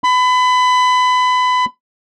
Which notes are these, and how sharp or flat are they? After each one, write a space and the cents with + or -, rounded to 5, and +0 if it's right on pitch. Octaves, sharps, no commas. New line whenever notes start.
B5 +25